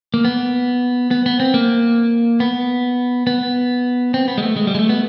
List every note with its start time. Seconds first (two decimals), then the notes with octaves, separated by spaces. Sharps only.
0.14 A#3
0.25 B3
1.11 B3
1.26 B3
1.40 C4
1.54 A#3
2.40 B3
3.27 B3
4.14 C4
4.28 B3
4.38 G#3
4.43 A3
4.57 G#3
4.67 G3
4.75 G#3
4.79 A3
4.89 B3